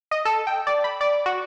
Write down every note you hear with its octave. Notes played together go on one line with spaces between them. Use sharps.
D#5
A4
G5
D5
B5
D5
F#4